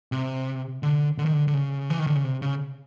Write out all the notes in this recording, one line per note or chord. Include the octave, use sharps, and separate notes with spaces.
C3
D3
D3
D#3
D3
D3
C#3
E3
D#3
D3
C#3
C3
C#3